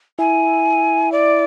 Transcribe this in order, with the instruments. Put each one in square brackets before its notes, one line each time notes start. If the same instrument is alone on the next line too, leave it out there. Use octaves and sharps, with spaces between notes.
[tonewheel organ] E4 [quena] G#5
[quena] D5